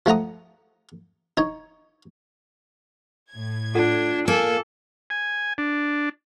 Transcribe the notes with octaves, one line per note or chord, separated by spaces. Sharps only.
F3 A3 F#5 A#5 D#6
D#4 C#5
A2 G#6
D4 F4 A4 F#5
A#3 A4 G#5
G#5
D4